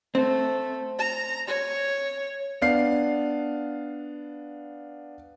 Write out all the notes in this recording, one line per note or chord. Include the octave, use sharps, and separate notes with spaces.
A3 C4
A#5
C#5
B3 D4 F5 C7